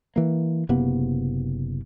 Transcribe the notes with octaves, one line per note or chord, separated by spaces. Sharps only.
E3 A#3
F#1 C3 A#3 B3